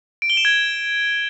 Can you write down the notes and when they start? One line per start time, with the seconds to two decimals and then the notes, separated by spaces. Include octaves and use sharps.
0.22 D7
0.30 G7
0.37 E7
0.45 G#6